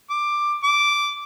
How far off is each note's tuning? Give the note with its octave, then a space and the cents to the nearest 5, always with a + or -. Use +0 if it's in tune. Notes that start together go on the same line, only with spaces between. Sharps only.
D6 +10
D6 -5